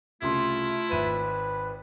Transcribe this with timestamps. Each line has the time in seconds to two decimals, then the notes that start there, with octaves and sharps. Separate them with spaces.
0.22 C2 C#3 A3 E4 F4 C6
0.91 G#1 B4 E5 D#7